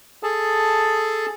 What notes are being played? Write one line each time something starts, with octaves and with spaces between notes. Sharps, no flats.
G#4 A4 A5